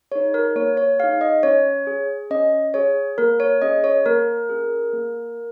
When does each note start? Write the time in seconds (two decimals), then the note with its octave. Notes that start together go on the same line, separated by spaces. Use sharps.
0.12 D#4 G#4 C#5
0.34 A#4
0.56 A#3 C#5
0.77 C#5
1.00 D#4 G#4 F5
1.21 D#5
1.43 C#4 C#5
1.87 G#4
2.30 C#4 D#5
2.74 G#4 C#5
3.18 A#3 A#4
3.40 C#5
3.62 C#4 G#4 D#5
3.84 C#5
4.06 A#3 A#4
4.49 C#4 G#4
4.93 A#3